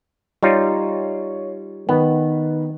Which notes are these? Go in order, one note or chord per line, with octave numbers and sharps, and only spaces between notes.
G3 D#4 F4 C#5
D#3 B3 B4